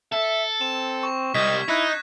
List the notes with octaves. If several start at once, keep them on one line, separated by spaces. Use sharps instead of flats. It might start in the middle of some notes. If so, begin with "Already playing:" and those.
A4 E5
C4 E7
C#6
C2 G3 D#5 G#6 B6
D#4 E4 F#6 A#6